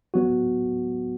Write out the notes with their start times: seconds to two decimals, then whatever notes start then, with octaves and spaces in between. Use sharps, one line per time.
0.14 F#3 B3 F#4